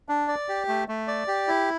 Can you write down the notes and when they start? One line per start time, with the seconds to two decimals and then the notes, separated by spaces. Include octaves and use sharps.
0.09 D4
0.28 D5
0.49 G4
0.68 A3
0.88 A3
1.08 D5
1.28 G4
1.48 E4